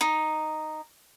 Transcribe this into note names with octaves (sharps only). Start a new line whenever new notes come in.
D#4